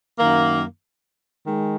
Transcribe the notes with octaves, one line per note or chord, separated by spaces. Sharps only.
F#2 D#3 A#3
D#3 G#3